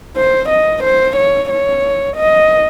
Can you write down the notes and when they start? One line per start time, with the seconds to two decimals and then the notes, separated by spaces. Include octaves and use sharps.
0.17 C5
0.49 D#5
0.84 C5
1.17 C#5
1.50 C#5
2.17 D#5